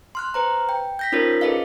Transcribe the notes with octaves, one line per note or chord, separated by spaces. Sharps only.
C6 F6 F#6
B4 C5 A#5
G5
G6 A#6 B6
C#4 D#4 F4 A#4 C5 C#5
G#4 A4 B4 D#5 F5